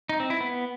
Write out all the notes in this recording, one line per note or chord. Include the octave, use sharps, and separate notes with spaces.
D#4
C4
E4
B3